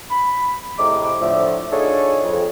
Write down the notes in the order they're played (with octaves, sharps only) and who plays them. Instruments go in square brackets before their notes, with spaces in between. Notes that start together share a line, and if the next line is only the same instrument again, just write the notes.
[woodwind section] B5
A2 C3 G#3 A#5 D6
A2 D3 F3 E5
D4 D#4 F4 G#4 A4 C#5
F2